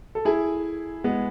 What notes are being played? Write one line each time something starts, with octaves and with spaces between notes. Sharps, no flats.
A4
E4 G#4
G#3 B3